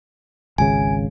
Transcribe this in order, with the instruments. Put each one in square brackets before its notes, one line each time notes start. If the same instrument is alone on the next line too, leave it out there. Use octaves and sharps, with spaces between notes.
[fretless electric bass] G#1 C#2 C#3 [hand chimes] G#5